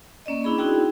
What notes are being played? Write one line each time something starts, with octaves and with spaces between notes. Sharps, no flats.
A#3 C#4 D5 D#5
C#4 D4 E4 G#4 B5
C4 D#4 E4 F#4 G#4 G5